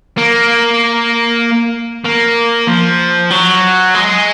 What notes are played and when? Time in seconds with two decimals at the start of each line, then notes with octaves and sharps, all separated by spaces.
0.18 A#3
2.05 A#3
2.68 F3
3.30 F#3
3.94 G#3